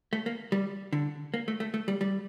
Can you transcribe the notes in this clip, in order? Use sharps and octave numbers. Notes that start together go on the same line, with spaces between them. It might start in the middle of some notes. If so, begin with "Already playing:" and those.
A3
A#3
G3
D3
A#3
A3
A3
A3
G3
G3